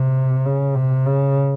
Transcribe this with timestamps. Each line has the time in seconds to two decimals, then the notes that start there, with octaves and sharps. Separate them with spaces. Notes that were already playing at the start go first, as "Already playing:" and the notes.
Already playing: C3
0.45 C#3
0.75 C3
1.06 C#3